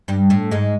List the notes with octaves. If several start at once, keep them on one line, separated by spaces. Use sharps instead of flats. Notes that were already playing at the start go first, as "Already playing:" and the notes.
G2 G3
A2 A3
G#2 G#3